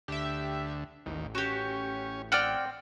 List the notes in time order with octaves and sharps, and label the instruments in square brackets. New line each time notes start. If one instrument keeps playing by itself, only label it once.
[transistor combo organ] D2 [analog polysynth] G4 E5
[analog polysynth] A1 [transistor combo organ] D#2
[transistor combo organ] C#4 [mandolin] F#4 G4
[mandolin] C4 G5 F6 [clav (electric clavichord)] D5 F#5